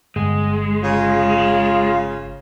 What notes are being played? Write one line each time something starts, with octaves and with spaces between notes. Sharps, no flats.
G1 G#3
C#3 F4